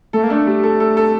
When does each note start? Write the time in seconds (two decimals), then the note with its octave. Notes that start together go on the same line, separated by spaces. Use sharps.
0.13 A3 A4
0.24 A#3
0.30 A3 D4
0.47 G3
0.63 A4
0.80 A4
0.97 A4